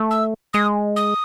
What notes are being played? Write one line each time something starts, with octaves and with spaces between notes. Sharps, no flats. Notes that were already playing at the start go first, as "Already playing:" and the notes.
Already playing: A3
E6
G#3 D#6
D#6